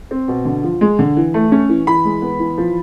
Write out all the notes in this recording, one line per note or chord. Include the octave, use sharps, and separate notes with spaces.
C4
B2
D3
F3
G#3
D3
E3
A3
C#4
E3
E3 B5
G#3
B3
E3
F3